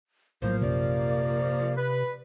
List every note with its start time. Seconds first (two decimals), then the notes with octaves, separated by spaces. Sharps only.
0.42 A#1 A2 F3 F#3 A#3 C5
0.62 A#1 F#2 C3 D5
1.76 B4